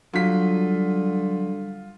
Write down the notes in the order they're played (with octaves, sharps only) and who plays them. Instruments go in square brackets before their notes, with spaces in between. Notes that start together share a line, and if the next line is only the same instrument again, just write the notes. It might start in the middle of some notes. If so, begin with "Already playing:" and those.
[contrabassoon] D3 [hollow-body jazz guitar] F#3 [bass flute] G3 [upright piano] F4 B6